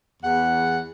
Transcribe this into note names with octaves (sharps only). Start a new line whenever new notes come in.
E2 F#5